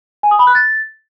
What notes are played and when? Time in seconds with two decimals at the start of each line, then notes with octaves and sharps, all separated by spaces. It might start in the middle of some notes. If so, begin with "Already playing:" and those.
0.23 G#5
0.31 D#6
0.39 B5
0.47 F#6
0.55 A6